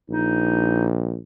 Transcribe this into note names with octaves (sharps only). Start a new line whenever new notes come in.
A#1 D#4